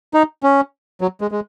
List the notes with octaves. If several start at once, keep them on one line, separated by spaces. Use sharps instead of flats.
D#4
C#4
F#3
G#3
G#3